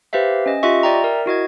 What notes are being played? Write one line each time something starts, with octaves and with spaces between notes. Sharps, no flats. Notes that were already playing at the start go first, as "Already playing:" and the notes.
G4 B4 C5 E5 F5
C#4 D#5
F4 G4 D#5 E5 C#6
D5 E5 G5 A#5
A#4
E4 F#4 D#5 G#6